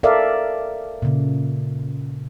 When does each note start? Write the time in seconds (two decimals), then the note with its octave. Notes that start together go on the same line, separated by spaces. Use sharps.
0.03 A4 A#4 D5 E5 F5
1.02 A#2 C#3